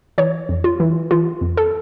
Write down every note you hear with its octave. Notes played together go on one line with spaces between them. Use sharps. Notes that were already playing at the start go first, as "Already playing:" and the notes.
E3 C#5
F2
F4
E3
E3 F4
F2
A4